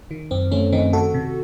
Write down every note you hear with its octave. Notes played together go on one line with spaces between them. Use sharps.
D#3
F#2 C4
D#3 A3 C#4
D#3 C4 D#4
D#3 F#4 A4
C3